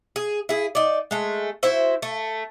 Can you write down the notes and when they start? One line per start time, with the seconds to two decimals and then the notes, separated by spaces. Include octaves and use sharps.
0.16 G#4
0.49 E4 G#4
0.75 D#4 D5
1.11 G#3 A3
1.63 E4 F#4 C5 E5
2.02 A3